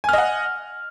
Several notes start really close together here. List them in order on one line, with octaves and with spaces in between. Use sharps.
G#5 F6 D#5 F#5